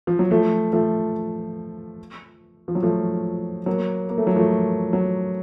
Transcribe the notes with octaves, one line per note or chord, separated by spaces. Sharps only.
F3
F#3
F3 A3
F3 A3
F3
F#3
F3 A3
F#3 A#3
A#3
A3
F#3
F3 A3
F#3